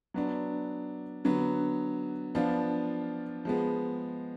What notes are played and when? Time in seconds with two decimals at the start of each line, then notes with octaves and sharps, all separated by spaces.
0.14 F#3 B3 D4
1.25 D3 F#3 B3
2.35 F3 B3 D4 F4
3.45 F3 G#3 B3